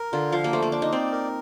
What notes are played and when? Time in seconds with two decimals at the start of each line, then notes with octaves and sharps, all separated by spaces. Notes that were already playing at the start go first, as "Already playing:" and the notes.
Already playing: A#4
0.12 D3 F4
0.32 F3 F5
0.44 A#3
0.53 A3 C5
0.62 A#3
0.72 D4 C5
0.82 D#4
0.92 C4 D5
1.12 A#4